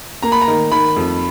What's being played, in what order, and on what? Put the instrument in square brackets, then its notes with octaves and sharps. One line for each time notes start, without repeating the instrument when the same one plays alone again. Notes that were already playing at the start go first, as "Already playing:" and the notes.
[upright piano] A#3 [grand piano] A#5
[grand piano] B5
A#5
[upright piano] D#3
[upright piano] D#3 [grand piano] B5
[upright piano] F2